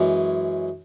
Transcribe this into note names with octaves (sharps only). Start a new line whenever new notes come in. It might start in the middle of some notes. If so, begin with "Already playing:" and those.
Already playing: F#2 E3 G#3 C#4